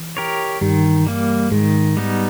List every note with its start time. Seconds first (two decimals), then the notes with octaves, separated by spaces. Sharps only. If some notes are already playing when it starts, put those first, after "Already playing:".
Already playing: E3
0.17 G4 A#4 C#5
0.61 G2 D#3 G3
1.06 G3 A#3
1.51 G#2 D#3 G#3
1.97 G3 B3 D#4